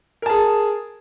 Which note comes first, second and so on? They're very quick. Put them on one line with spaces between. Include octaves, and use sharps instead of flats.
A#4 A5 G#4